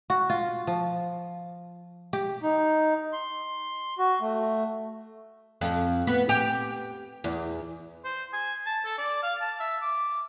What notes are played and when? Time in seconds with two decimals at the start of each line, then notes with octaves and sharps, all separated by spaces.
0.10 F#4
0.30 F4
0.67 F3
2.13 G4
2.42 D#4
3.13 C6
3.98 F#4
4.21 A3
5.61 F2
6.07 B3
6.29 G4
7.24 E2
8.04 C5
8.33 G#5
8.66 A5
8.85 A4
8.98 D5
9.23 F5
9.41 A5
9.60 E5
9.82 D6